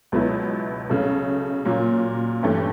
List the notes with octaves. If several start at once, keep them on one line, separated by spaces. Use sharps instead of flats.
C#2 B2 F#3 B3 E4
C#3 F#3 A3
A#2 F#3 A#3
G2 E3 A3 C#4